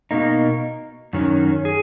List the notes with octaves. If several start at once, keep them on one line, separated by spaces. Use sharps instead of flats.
B2 A#3 D#4
F#2 D#3 F#3 C#4
G#4